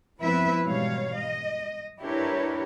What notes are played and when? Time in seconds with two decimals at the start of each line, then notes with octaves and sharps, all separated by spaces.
0.19 F3 B3 C4 E4 B4 E5
0.67 G#2 B2 E3 G3 C#5 F5
1.19 D#5
2.00 D4 E4 G4 A#4 B4 C#5